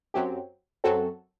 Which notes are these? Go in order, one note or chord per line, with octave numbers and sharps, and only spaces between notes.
F#2 F#3 C4 G4
F#2 F#3 C4 F#4 A4